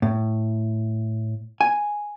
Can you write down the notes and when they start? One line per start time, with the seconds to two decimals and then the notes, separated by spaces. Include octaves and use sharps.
0.02 A2
1.61 G#5